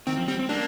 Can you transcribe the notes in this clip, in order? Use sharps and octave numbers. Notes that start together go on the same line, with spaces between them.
D#3 C4
F3
G3 C4
C4
A#3 D4